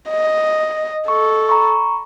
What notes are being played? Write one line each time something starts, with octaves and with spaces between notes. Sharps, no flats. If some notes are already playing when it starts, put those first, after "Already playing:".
D#5
A4 C#6
A#5 B5 C#6